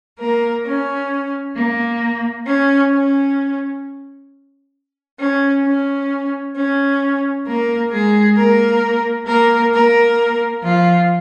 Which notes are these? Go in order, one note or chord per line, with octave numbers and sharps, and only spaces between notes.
A#3 A#4
C#4
A#3
C#4
C#4
C#4
C#4
C#4
A#3 A#4
G#3 G#4
A#3 A#4
A#3 A#4
A#3 A#4
F3 F4